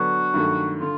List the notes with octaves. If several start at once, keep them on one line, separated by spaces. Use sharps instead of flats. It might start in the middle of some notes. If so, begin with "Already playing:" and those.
Already playing: D3 F#3 B3 D4 F#4
G2 D#3 F#3 A3
D3 F4